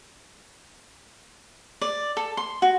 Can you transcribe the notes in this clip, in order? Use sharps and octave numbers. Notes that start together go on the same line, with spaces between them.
D5
A4
C6
F#4